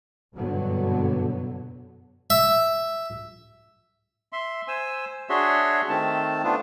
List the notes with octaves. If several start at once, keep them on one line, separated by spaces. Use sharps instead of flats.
F#1 G2 B2 D3 F#3 B3
E5
E5 C6
C5 G#5 E6
D4 F#4 G#4 C#5 E5 C6
D#3 A3 C4 A5
A3 B3 D4 F4